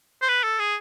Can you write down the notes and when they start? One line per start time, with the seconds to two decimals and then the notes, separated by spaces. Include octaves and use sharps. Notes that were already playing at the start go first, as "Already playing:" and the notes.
0.22 C5
0.28 B4
0.44 A4
0.59 G#4